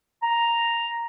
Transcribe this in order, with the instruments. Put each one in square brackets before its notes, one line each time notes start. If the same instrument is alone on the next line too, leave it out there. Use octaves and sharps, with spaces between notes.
[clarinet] A#5